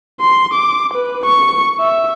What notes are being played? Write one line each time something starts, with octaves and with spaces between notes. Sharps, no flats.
C6
D6
B4
C#6
E5